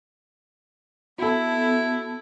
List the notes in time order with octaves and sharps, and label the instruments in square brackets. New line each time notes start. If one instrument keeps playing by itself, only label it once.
[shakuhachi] B3 [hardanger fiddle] E4 [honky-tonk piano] F#4 A4